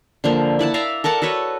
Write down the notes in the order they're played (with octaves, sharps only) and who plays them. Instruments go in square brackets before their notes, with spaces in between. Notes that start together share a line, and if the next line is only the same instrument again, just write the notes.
[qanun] D3 F3 A#3
E4 D5 F#5 A5
D5 E5 F5 A#5
A4 A#4 F#5 A5
F#4 A4 B4 C#5